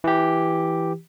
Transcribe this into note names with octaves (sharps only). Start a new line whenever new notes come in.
E3 G4